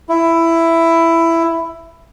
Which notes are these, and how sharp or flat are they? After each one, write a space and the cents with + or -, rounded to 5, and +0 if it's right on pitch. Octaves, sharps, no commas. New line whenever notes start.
E4 +10